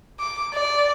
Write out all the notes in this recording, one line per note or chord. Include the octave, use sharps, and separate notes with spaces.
D6
D5